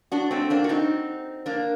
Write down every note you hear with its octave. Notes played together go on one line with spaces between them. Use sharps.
D4 F#4
A3 C4
A#3 D4
F#4
C4 D#4
A#3 D4